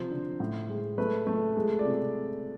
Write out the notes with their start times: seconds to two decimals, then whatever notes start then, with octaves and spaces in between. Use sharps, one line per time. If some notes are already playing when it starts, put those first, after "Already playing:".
Already playing: C3 F3 C5
0.11 D3
0.40 A2
0.69 G#3
0.98 A3 B4
1.27 A3
1.56 G#3
1.79 D5
1.85 C3